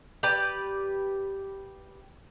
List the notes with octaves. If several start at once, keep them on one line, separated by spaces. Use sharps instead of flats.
G4 B4 D5